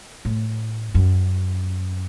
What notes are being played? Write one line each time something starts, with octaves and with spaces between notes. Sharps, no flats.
A2
F#2